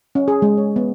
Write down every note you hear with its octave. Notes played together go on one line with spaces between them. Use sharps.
C#4
G#4
G#3
C#5
B3